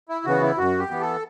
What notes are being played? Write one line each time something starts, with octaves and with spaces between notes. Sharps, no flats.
E4
C#3 E3 B3 F#4
E4
F#2 F#4
G4
E3 B3
A4